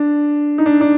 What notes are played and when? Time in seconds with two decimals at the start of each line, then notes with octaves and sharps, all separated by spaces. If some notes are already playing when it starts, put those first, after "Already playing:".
Already playing: D4
0.58 D#4
0.66 D4
0.81 D4